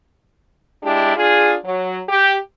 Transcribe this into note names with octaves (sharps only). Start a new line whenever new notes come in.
G#3 D4 E4 G4
D4 F4 G#4
F#3
G4